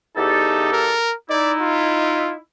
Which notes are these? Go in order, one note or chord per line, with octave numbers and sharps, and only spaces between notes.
E2 D#4 G4 A4
A#4
D#4 E4 D5
F4